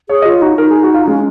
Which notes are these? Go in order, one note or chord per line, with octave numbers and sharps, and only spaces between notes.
G#4 C#5
D#5
F4 C#5
D#4 F#4
D#4 A#4
G#4
F#4
F4
G#3 C#4